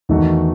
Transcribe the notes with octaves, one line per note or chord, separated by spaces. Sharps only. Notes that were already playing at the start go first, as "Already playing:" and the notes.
E2 D#3 A3 D#4 F#4